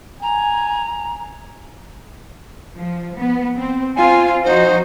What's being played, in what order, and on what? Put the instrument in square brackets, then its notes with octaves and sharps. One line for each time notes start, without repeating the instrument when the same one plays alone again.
[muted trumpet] G#5 [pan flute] A#5
[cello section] F3
B3
C4
[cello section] C4 F4 [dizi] G#5
[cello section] F3 D#4 F#4 [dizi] C5